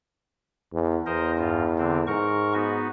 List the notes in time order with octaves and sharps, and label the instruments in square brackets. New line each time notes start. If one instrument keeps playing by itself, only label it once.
[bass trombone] E2
[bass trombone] E2 [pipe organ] A#4 C5 D#5
[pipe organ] G2 F4
D3 C4
[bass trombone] G#2 [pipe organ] A#4 C#6
[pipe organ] B3 D#4 F#4